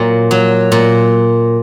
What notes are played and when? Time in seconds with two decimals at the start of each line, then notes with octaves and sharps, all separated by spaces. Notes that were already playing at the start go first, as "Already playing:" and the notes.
Already playing: A#2 F#3
0.31 F#3
0.72 A#2